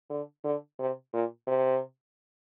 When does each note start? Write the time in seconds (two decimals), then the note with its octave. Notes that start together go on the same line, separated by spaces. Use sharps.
0.10 D3
0.44 D3
0.79 C3
1.13 A#2
1.47 C3